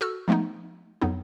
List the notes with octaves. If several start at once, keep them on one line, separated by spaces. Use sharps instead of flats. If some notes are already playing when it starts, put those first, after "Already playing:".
F#4 A4 E6 F6
F3 G#3 A3 B3 D#4
F2 F#3 B3 D#4